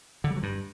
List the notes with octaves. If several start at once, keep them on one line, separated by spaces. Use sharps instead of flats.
D3
G3
F#3
G2